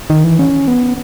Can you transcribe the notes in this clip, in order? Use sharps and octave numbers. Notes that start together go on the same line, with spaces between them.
D#3
E3
C#4
B3